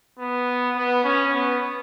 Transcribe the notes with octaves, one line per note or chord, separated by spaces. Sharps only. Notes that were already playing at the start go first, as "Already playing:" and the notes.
B3
B3
C#4
B3